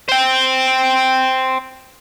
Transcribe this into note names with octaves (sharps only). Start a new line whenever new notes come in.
C5 G5